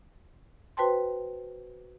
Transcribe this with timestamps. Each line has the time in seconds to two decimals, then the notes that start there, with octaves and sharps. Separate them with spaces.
0.77 F#4 B4 C5 G5 A5 C6